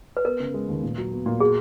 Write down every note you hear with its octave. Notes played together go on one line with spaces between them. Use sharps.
B4
B3 A#4
C#3
G#3
D#2
A#2
F#3
B3
A#2
F#4 G#4